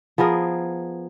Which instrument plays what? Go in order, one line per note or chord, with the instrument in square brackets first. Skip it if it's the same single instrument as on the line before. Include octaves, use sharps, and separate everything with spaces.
[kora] F3 B3 G#4 A#4